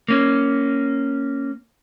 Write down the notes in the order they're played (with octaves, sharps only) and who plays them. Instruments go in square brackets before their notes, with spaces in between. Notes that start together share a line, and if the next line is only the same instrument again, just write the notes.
[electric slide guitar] A#3 C#4